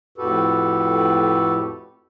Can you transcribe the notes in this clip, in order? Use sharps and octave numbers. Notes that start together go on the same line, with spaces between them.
F2 A2 F#4 G4 A4 B4